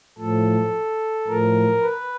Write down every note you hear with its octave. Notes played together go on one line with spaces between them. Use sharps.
A2 F3 A4
A2 F3 A#4
B4